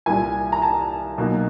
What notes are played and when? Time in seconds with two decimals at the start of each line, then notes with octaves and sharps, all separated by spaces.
0.06 C2 A#2 G3 G#5
0.52 A#5
0.62 A5
1.18 B1 B2 F#3 A#3